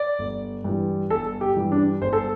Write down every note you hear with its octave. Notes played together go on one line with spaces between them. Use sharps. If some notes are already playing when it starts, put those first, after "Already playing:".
Already playing: D5
G1
G2 E3
G1 A4
G4
G2 E3
D4
G1 C5
A4